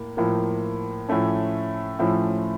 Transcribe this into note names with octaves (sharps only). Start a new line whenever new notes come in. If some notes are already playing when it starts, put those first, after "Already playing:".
Already playing: A2 A#3
A2 F3 A#3
A2 F3 A3 C#4
A2 F3 A3 C#4